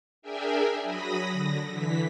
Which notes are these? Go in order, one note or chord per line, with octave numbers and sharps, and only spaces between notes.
D4 G#4 A#4 E5 G5 G#5
F#3 B5 D#6 A#6
D3 A#6
D3 E3 B6